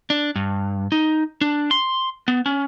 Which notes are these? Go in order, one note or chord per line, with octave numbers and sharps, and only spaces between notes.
D4
G2
D#4
D4
C6
B3
C#4